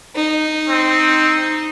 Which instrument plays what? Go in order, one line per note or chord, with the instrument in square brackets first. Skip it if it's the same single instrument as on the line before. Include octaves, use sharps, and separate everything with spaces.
[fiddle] D#4
[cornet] C4